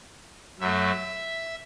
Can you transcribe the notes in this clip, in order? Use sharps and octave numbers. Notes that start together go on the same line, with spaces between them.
F#2 F#3 A3 E5